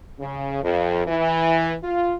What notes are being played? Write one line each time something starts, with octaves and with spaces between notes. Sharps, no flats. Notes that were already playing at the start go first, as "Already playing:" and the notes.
C#3
F2
E3
F4